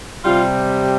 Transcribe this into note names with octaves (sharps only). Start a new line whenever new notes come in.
C3 G3 F4